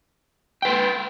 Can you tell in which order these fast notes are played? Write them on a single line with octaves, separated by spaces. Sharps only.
G5 B4 C6